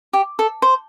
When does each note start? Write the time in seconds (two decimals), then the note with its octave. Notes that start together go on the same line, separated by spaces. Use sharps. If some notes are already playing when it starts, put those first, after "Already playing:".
0.13 G4
0.39 A4
0.62 C5